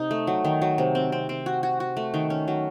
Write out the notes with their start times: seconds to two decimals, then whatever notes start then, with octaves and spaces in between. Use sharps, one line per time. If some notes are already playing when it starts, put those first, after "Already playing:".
Already playing: C3 D#4
0.11 A3
0.27 F#3
0.45 D#3
0.62 F#3
0.78 C3
0.95 C4
1.12 C4
1.29 C4
1.46 F#4
1.63 F#4
1.80 F#4
1.97 A3
2.14 D#3
2.30 C#4
2.48 F#3